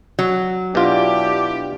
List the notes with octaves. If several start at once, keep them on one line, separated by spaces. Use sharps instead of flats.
F#3
B2 D4 E4 F4 G4